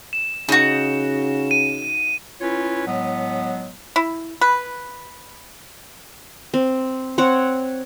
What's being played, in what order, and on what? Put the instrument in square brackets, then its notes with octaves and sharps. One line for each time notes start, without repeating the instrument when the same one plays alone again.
[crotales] E7
[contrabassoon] C#3 [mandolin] D#4 F#4
[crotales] D#7
[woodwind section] C#4 E4 F4 B4 C#5
A2 F#3 G#3 B3
[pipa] E4
B4
[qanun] C4
C4 C#5 F#5